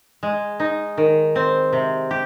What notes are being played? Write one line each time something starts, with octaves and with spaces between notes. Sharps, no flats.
G#3
D#4
D#3
C4
C3
G4